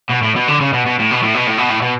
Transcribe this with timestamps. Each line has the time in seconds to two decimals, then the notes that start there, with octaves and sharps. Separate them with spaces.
0.09 B2
0.22 A2
0.35 B2
0.48 D3
0.60 C#3
0.73 B2
0.86 B2
0.99 A2
1.11 B2
1.23 A2
1.34 B2
1.47 A2
1.58 B2
1.70 A2
1.82 B2